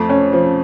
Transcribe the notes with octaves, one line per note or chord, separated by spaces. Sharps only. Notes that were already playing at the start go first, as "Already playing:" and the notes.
Already playing: F2 A3
C#4
F3